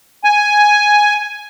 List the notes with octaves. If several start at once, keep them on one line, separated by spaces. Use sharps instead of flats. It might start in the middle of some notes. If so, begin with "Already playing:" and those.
G#5